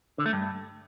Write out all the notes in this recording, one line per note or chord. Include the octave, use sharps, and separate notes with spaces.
D3
A3
G2